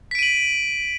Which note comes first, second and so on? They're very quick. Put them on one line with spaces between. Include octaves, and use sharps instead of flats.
B6 D7 D#7 F#7